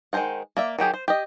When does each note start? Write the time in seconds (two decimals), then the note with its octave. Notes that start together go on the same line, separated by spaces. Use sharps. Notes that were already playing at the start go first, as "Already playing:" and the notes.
0.13 D#3 G#3 A#4 C5 F#5
0.57 A#3 D5 E5
0.79 D#3 F#3 G4 G#4
0.94 C5
1.08 G4 D#5